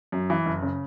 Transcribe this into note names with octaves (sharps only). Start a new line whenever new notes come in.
F#2
E3
F#1
C#3